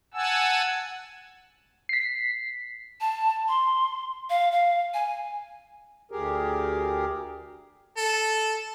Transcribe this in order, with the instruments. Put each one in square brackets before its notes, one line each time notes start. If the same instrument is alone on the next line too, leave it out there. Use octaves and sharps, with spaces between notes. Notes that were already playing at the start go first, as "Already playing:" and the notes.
[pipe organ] F#5 G#5 A5 E6
[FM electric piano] B6 C7
[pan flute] A5
C6
F5
F5
G#5
[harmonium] D2 G4 G#4 A#4
[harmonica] A4